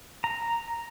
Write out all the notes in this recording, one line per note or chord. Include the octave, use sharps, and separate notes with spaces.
A#5